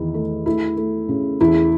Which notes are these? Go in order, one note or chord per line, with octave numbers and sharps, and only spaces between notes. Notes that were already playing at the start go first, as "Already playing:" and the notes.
Already playing: E2 D#3 E4
A3
A3 E4
A3
C#3
E2 E4